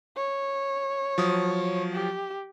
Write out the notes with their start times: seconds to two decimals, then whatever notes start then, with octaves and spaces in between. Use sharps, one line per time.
0.16 C#5
1.18 F3 F#3 D#6
1.93 G4